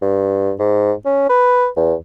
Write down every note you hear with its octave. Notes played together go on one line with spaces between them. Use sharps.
G2
G#2
C#4
B4
E2